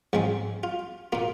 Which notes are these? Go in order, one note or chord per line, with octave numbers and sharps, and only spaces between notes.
G#2 F3 G#3 C4
F4
A#2 A#3 F4